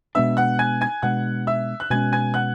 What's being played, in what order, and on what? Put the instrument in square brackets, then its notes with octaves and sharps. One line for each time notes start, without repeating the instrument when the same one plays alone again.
[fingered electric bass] B2 G#3 B3 D4 [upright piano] E5 E6
[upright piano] F#5 F#6
G#5 G#6
G#5 G#6
[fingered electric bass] B2 G#3 B3 D4 [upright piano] F#5 F#6
[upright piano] E5 E6
F#6
[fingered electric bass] B2 G#3 C#4 [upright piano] G#5 G#6
[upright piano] G#5 G#6
F#5 F#6